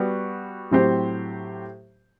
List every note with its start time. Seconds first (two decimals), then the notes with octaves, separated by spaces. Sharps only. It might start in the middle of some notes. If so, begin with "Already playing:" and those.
Already playing: G3 B3 F#4
0.71 A2 F#3 C4 G4 C5